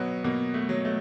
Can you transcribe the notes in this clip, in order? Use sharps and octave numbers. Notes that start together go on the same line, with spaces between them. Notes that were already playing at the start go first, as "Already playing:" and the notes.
Already playing: B2 F#3 B3
B2 A#3
A3
F#3
A3